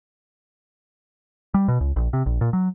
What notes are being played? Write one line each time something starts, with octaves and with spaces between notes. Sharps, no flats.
G3
B2
C#2
A#1
C3
A#1
A#2
F#3